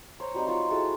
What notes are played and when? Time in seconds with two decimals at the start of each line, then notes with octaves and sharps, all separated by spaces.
0.20 C5 C#5 A#5
0.34 F#3 G3 C4 D#4
0.47 F4 C5 C#6
0.70 E4 F#4 G#4 A4